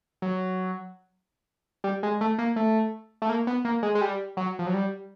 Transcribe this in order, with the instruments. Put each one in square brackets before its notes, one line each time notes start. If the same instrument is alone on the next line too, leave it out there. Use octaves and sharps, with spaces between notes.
[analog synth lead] F#3
G3
G#3
A3
A#3
A3
A3
A#3
B3
A#3
G#3
G#3
G3
F#3
F3
F#3
G3